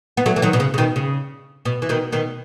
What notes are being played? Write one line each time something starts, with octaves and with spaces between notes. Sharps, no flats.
B3
F#3 A3
E3
D#3 F#3
B2
C#3
C#3
B2 D#3
C#3
B2
E3
B2 D#3
B2 D#3